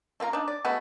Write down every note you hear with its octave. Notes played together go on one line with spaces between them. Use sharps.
A3 A#3 F4 A#4
D4 D#4
D5
G#3 A3 B3 F#4